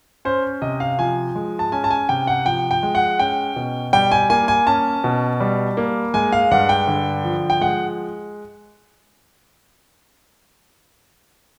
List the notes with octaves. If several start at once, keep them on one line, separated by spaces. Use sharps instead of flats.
C#4 C5
C3 D#5
F5
F3 G#5
G#3
A5
C#4 G#5
A5
G#5
C3 G5
F#5
F3 G5
G5
G#3
F#5
C#4 G5
B2
G3 G5
G#5
A#3 G#5
G#5
C#4 A5
B2
G3
A#3
G#3 G#5
F5
G2 F#5
G5
D3
F3
G5
G#3 F#5